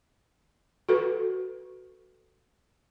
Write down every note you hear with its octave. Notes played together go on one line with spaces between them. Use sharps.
F#4 A4 B4